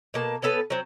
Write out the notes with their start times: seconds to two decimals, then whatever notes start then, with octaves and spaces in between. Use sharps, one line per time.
0.14 B2 A#3 A5
0.42 B3 C#4 A4 B4
0.70 F#3 C4